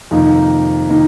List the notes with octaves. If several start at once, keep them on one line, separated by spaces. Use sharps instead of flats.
F2 C3 D#3 A#3 D#4
C3 D#3 A#3 D#4